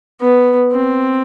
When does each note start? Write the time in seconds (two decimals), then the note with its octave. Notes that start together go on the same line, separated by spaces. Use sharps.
0.21 B3
0.71 C4